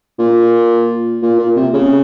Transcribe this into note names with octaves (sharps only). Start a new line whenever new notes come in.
A#2
A#2
A#2
C3
C#3